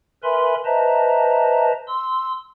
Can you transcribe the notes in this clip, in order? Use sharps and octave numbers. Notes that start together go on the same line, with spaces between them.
A#4 B4 E5 G#5 B5 C6
B4 C5 D#5 E5 A5 A#5
C6 E6